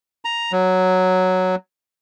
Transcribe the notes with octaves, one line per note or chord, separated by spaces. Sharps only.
A#5
F#3